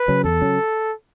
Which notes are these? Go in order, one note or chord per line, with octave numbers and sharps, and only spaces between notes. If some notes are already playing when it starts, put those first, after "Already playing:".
Already playing: B4
C#3 F#3 C#4
E2 A4
C#3 F#3 C#4